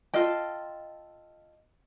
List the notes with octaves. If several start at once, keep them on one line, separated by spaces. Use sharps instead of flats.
F4 A4 D#5 G5